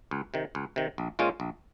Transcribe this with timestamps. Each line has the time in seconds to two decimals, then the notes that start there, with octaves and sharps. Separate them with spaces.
0.11 C#2
0.34 C3 D#3
0.55 C#2
0.76 C3 D#3
0.98 A#1
1.19 A#2 G#3 C#4 F4
1.40 A#1